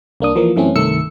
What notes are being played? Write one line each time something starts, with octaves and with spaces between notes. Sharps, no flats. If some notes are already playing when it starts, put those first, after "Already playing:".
C2 A#3 D4 D#6
E3 F3 A#3
F#2 E3 A3 C4 C#4
C2 G2 D#3 A3 E6 C#7